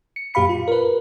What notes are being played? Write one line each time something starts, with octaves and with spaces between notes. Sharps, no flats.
C#7
F#2 A#2 G4 F5 B5 C#7
F4
A#4 B4